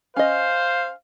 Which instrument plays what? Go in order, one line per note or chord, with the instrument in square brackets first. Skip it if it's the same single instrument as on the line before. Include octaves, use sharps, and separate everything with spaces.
[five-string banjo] C#4 D#5 [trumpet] C5 [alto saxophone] F5